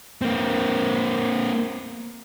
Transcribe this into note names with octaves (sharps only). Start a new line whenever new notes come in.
A#3 C4